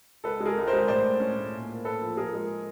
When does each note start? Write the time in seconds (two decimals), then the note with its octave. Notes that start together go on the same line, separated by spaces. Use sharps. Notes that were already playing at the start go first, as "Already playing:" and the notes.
0.24 C#2 A4 B4
0.40 G#3
0.46 G#4 A#4
0.57 C#2
0.67 A#4 C5
0.73 G#3
0.88 A2 C5 D5
1.04 A2
1.20 C#4
1.36 A2
1.53 A#2
1.68 A#3
1.84 A#2 A4 B4
2.01 F3
2.16 F3 G#4 A#4
2.33 G#3